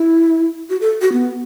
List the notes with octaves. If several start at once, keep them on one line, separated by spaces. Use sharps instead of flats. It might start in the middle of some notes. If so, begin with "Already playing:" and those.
Already playing: E4
F#4
A4
F#4
B3